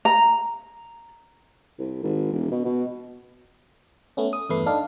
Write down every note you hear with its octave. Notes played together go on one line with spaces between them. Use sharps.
A#5
C2
G#1
E1
B2
B2
A3 B3 C#4
D#6
E2 G2 A3 B4 C7
D4 D#4 A4 F5